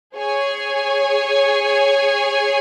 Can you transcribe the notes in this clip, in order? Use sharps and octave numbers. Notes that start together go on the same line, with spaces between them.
G#4 C#5 G#5